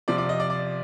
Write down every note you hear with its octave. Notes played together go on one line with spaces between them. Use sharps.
C3 F3 D5
D5
D#5
D5
D5